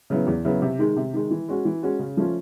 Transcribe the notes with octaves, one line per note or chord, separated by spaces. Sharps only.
C#3 F#3 B3 E4
E2
C#3 F#3 B3 E4
C3
D#3 G#3
C3
D#3 G#3
E3
G#3 C#4 F#4
E3
G#3 C#4 F#4
C#3
F3 A3 C#4 F4